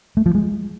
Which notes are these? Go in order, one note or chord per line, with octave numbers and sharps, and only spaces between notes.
A3
F3
G#3